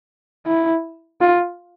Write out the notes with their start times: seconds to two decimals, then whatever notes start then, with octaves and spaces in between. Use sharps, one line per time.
0.46 E4
1.21 F4